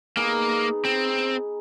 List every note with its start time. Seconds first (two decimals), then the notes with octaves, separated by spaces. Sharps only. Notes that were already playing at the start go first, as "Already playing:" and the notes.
0.17 A#3 B3 D#4 G#4
0.85 C4